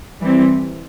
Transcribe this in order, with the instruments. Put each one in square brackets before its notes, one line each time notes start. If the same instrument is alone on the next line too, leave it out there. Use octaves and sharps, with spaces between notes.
[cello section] E3 G3 C4